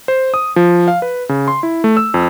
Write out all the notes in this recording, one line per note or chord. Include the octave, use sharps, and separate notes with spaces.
C5
D#6
F3
F5
B4
C#3
C6
E4
A3
E6
F2